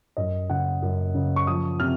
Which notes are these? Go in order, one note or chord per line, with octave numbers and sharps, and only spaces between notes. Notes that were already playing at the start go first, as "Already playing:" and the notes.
F#2 D#5
C#3 F#5
F#2
C#3
C#6
F3 D#6
C3 F6